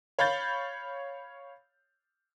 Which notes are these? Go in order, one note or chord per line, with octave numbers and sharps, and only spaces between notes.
C#5 F5 B5 G6 A6